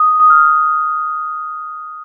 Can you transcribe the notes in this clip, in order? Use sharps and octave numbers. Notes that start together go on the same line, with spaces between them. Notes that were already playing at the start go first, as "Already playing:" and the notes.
Already playing: D#6
D#6
F6